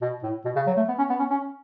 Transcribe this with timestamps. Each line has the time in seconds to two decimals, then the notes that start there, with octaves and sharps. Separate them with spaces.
0.02 B2
0.23 A2
0.45 B2
0.56 C#3
0.67 F#3
0.77 A3
0.88 B3
0.98 C#4
1.10 B3
1.20 C#4
1.30 C#4